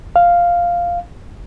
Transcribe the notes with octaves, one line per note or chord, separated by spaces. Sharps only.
F5